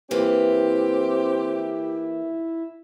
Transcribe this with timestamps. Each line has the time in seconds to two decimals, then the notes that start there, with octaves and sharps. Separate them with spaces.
0.11 E3 A#3 C4 E4 G4